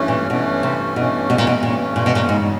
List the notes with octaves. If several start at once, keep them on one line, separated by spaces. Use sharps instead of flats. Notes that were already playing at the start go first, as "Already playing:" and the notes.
Already playing: G2 E3 A3 C#4
A#2
G2 B2 E3 A3 C#4
C3
G2 B2 E3 A3 C#4
B2
A#2
B2
G2 A#2 E3 A3 C#4
A#2
B2
A#2
E2 G#2 C#3 F#3